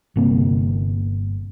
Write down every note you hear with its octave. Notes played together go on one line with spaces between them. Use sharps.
G1 C3 A#3